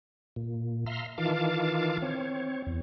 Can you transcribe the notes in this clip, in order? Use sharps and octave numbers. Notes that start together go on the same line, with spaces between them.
A#2
E5 F5 A#5 C6
D#3 E3 F4 F5 A5 D6
C4 C#5
E2